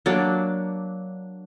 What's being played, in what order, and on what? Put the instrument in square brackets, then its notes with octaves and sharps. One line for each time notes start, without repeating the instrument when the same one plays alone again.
[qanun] F#3 A#3 D4 D5